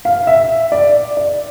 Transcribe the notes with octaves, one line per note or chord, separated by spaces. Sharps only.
F5
E5
D5
D5